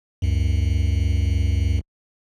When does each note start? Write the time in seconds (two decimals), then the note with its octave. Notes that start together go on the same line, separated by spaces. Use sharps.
0.22 C#2 F#2